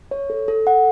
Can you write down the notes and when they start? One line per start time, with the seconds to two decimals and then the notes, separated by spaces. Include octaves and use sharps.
0.11 C#5
0.30 A4
0.48 A4
0.67 F#5